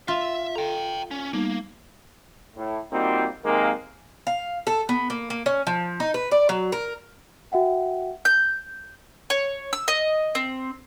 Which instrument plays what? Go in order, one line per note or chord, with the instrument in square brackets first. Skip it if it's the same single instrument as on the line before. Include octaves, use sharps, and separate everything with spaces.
[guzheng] F4 [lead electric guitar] E5
[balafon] A4 [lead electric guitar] G5 A#5
[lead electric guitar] C#4
[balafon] G3 B3 D#4 [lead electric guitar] A#3
[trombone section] A2
G3 A#3 C4 D#4 F4 F#4
C3 D#3 G#3 A#3
[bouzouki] F5
A4
B3
A#3
A#3
C#4
F3
D#4
B4
D5
F#3
A#4
[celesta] F#4 E5 F#5 G5
[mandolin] G6
C#5
E6
D#5
C4